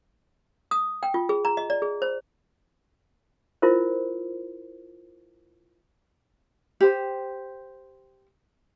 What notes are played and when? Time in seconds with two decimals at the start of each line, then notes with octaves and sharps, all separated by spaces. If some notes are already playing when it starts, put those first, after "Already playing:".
0.71 D#6
1.03 G5
1.14 F4
1.29 G#4
1.45 A#5
1.57 D#5
1.70 D5
1.82 G#4
2.02 C5
3.62 E4 F4 A#4 C5
6.81 G4 C5